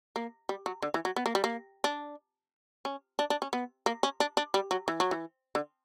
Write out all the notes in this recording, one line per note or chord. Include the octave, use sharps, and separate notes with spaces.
A#3
G3
F#3
D3
E3
F#3
B3
A#3
G3
A#3
D4
C#4
D4
D4
C#4
B3
A#3
C#4
D4
D4
G3
F#3
E3
F#3
E3
D3